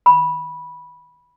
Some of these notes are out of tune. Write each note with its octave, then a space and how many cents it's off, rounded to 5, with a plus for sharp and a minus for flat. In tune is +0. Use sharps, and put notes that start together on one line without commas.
B5 -10